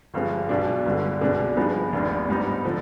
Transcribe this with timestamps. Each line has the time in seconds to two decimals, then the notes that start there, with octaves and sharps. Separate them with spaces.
0.14 G1 G2 F3 G#3
0.49 B1 B2 G#3 D4
0.86 G1 G2 D3 G#3
1.21 C2 B2 G#3 D4
1.57 G2 F3 G#3 B3 D#4
1.93 F1 D#2 D#3 B3 D4
2.29 G#2 G3 B3 D#4
2.64 D3 F3